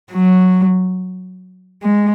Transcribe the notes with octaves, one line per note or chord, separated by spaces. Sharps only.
F#3
G#3